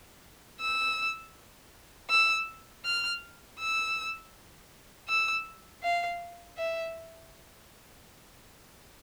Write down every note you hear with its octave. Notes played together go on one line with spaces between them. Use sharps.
E6
E6
F6
E6
E6
F5
E5